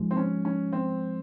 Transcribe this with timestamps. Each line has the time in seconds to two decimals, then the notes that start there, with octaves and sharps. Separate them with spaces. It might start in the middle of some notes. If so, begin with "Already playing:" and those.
Already playing: G#2 F3 G#3
0.11 C4
0.17 C#4
0.45 C#4
0.73 C4